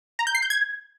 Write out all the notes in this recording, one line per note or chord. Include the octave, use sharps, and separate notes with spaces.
A#5
G6
C7
G6
G#6